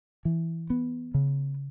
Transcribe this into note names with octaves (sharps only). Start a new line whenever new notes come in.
E3
B3
C#3